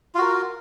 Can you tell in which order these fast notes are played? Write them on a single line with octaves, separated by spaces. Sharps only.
F4 F#4 A#4